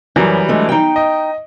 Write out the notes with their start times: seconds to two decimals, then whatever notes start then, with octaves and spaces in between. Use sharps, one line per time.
0.16 F#2 E3 F#3 G3
0.49 G#3 A3 D4
0.69 D#4 G5
0.96 D#5